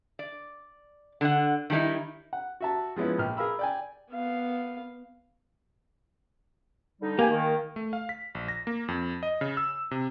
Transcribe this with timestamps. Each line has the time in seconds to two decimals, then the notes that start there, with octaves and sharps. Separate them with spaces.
0.19 D5
1.21 D3 F#5
1.70 D#3 G3 A3 D#4 E4
2.33 F#5
2.60 F#4 E5 A5
2.96 F3 G#3 B3 C#4 E4
3.18 A#1 G5 F6
3.37 G#4 A#4 F5 B5 E6
3.59 D5 G5 G#5
4.11 B3 F5
7.02 D3 G3 D#4
7.19 A#3 G4 G#5
7.31 D#3
7.76 A3
7.93 F5
8.09 B6
8.35 A#1
8.48 A#6
8.67 A#3
8.88 F2
9.23 D#5
9.41 C#3
9.57 E6
9.91 C3